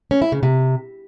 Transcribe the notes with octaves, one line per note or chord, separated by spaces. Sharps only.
C#4
E4
C#3
C3